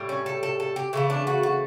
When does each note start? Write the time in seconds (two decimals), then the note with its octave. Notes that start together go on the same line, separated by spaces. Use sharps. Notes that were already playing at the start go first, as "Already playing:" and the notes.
Already playing: A2 G3
0.09 C#4
0.26 A4
0.43 A4
0.60 A4
0.76 G4
0.93 C#3 E3 A3 E4
1.10 D4
1.27 F#4
1.43 F#4